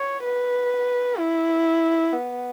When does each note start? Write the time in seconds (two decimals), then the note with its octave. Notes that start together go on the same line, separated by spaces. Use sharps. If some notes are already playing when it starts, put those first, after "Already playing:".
Already playing: C#5
0.24 B4
1.18 E4
2.13 B3